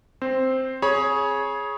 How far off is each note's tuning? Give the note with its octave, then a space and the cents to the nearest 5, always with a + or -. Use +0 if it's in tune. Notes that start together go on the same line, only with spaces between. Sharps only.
C4 +0 C5 +0
G#4 +10 C#5 +0 B5 -35